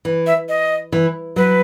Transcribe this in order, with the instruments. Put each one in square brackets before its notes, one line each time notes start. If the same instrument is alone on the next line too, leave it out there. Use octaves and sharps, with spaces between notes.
[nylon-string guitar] E3
[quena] E5
D#5
[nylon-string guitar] E3
[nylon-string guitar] F#3 [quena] B4